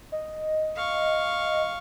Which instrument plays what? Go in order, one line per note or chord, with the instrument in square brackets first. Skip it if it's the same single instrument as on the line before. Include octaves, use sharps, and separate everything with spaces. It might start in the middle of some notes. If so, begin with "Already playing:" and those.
[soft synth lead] D#5
[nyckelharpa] F5 C#6